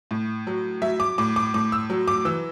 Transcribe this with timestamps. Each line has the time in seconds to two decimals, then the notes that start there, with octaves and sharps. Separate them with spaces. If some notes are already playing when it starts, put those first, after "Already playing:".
0.11 A2
0.47 F#3
0.82 F#3 E5
1.00 D6
1.18 A2 D6
1.36 D6
1.54 A2 D6
1.72 E6
1.90 F#3
2.08 D6
2.25 E3 E6